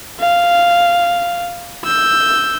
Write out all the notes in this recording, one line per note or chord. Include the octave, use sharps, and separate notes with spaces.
F5
E6 G6